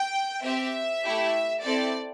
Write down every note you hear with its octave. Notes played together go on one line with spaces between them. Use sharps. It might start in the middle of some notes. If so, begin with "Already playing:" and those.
Already playing: G5
C4 G4 E5
A3 E4 G4
C4 E4 A4 D5